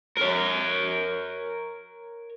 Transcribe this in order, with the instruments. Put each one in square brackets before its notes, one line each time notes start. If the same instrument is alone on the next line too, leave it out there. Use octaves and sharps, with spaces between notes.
[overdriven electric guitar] A#4 C#5